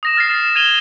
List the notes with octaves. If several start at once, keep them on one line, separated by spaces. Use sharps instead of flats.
D#6 A#6 E7
F6 A6 A#6 C7 E7
G#6 D#7 F7 G7